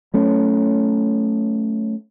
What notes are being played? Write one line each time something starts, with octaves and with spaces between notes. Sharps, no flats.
F#3 A3 C#4